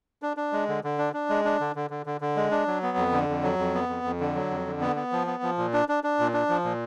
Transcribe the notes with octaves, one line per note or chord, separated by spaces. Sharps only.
D4
D4
G#3
D3
D3
D4
D4
G#3
D4
D3
D3
D3
D3
D3
G#3
D4
F#3
B3
F2
D3
F2
F#3
F2
B3
F2
F2
D3
F#3
F2
D3
B3
B3
F3
B3
F3
A#2
D4
D4
D4
A#2
D4
F3
A#2